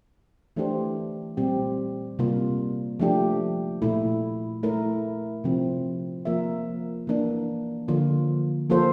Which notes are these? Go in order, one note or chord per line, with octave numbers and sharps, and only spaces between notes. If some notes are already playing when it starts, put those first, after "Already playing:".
E3 A3 D4 G4 C5
A#2 G3 C4 G4
C3 G3 A#3 F4
F3 A3 D4 G4
A#2 A3 E4
A3 E4 A#4
C3 F3 C4
F3 A#3 F4 A#4 E5
E3 A#3 D4
D3 F3 A#3 F4
F3 A#3 F4 A4 C5